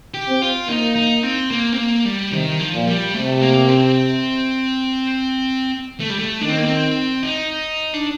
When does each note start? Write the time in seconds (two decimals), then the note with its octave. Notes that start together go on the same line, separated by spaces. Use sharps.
0.14 G4
0.28 C4
0.42 F4
0.68 A#3 D#4
0.96 D#4
1.23 C4
1.51 A#3
1.73 C4
1.78 A#3
2.05 G3
2.32 C3 D#3
2.59 F3
2.74 A#2
2.87 G3
3.14 C3 A3
3.41 A#3
3.69 C4
6.00 A3
6.10 G3
6.19 A3
6.41 D#3 D4
6.49 C4
6.58 A#3
6.66 C4
7.23 D#4
7.94 D4